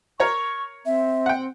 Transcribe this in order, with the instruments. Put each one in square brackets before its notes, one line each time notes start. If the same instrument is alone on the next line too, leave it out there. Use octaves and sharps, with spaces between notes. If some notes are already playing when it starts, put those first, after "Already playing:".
[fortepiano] A#4 C#5 A#5 [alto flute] C#6
[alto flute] C4 [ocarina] E5
[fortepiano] F#5 G5